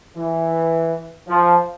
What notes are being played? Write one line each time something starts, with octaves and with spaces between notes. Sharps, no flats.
E3
F3